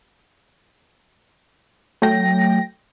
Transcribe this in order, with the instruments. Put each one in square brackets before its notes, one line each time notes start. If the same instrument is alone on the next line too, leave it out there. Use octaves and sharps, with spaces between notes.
[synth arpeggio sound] F#3 A3 G5 A#6